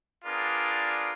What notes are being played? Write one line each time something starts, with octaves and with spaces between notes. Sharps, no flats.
B3 D4 F4 G#4 A#4 D5